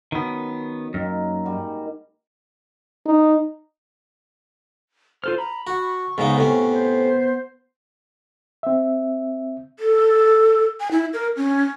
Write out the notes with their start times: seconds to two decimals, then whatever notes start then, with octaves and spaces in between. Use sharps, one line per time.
0.12 F#2 D#3 B3 C#5
0.94 F#2 D#3 A#3
1.45 G#2 G3 F#4
3.06 D#4
5.24 F4 A4 C5 F6
5.38 A#5 B5
5.67 F#4 C#6
6.18 G#2 C#3 B3 D#4
6.37 A2 C3 C#4
6.73 C5
8.63 C4 E5
9.79 A4
10.80 G#5
10.91 E4
11.14 A#4
11.37 C#4